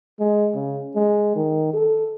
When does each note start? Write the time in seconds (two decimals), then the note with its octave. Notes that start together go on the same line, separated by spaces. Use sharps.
0.20 G#3
0.55 C#3
0.95 G#3
1.36 D#3
1.74 A4